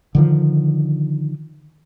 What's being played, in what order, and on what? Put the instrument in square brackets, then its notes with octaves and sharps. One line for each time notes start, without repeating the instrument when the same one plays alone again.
[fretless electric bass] D3 D#3 F3